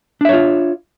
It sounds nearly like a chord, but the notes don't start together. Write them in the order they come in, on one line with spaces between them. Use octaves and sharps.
D4 E5 C#5 F4